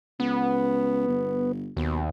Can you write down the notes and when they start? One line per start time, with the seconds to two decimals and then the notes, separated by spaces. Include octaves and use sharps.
0.20 C#2 B3
1.08 G1
1.77 D#2 B2